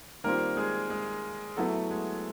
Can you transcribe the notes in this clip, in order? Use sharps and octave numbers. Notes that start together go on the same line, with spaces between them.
D#3 G3 A#3 C4 F4 A#4
G#3 G#4
G#3 G#4
F#3 A3 B3 E4 A4
G#3 G#4